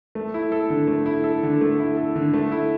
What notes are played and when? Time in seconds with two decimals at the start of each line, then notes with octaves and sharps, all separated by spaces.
0.15 A3
0.34 E4
0.52 A4
0.70 D3
0.87 A3
1.06 E4
1.24 A4
1.43 D3
1.61 A3
1.79 E4
1.97 A4
2.16 D3
2.34 A3
2.52 E4